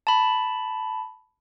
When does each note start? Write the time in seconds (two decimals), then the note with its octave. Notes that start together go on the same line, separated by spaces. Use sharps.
0.07 A5 B5